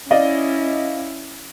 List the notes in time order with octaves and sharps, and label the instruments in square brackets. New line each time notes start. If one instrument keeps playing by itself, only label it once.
[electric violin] C#4 E4 [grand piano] D5 D#5 F5